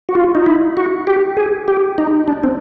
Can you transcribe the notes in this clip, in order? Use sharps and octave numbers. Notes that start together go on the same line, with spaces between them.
F#4
F4
D#4
E4
F#4
G4
G#4
G4
D#4
D4
C4